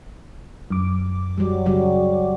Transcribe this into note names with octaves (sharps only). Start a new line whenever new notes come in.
F#2 D6
F#3 G3
C#3 F#3 G3